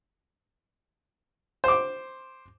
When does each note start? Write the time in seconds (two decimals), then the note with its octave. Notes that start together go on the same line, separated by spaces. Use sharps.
1.64 C5 D6